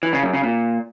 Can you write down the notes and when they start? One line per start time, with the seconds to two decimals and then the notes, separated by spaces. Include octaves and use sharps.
0.03 E3
0.13 C#3
0.23 F#2
0.33 C#3
0.44 A#2